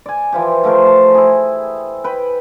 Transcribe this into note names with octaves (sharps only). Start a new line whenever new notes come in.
D5 G#5
E3 F3 G4
F3 A3 A#4 C5
A5
E4 G#4
B4 G5